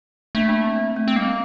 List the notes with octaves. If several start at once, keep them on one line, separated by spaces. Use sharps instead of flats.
A3 A#3 D4
A#3 D4
C4
A#3
A3
C4
G3 A#3